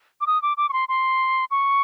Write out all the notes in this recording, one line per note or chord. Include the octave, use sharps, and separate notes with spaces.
D6
D#6
D6
D6
C#6
C6
C6
C#6